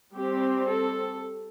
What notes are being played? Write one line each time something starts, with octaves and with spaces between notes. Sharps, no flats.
G3 C4 G4
A4